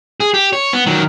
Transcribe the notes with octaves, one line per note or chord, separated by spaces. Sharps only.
G#4
G4
C#5
B3
D#3 F#3